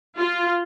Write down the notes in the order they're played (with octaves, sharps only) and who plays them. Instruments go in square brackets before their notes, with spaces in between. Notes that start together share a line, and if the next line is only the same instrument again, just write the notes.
[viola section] F4